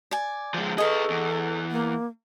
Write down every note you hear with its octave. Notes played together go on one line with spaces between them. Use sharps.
D5 G#5
F3 G#3
G#4 A4 B4 D#5 C#6
E2
A#3